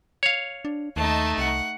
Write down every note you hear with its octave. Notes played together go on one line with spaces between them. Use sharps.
C#5 F5
D4
D#2 A3 D#4 D#5 A5
C2 F#5